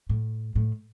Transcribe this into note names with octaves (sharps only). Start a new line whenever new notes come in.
A2
A2